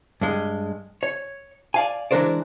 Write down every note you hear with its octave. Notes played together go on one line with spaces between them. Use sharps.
G2 G#3
C#5
D5 F5 G#5
E3 G#3 D4 A#4 C5 D5